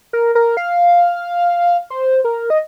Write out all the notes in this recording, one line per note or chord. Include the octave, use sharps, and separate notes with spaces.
A#4
A#4
F5
C5
A#4
D#5